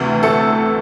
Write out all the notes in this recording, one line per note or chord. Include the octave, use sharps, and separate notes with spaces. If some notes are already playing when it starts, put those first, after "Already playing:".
Already playing: D2 C3 E3
A3 A4